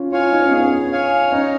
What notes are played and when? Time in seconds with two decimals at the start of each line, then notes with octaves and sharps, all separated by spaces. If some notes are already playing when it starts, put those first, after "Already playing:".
Already playing: C#4 F4
0.12 F4 C#5 F5 G#5
0.32 D#4
0.42 C#4
0.51 B3 G#4
0.60 C#4
0.92 C#5 F5 G#5
1.32 C#4 D#4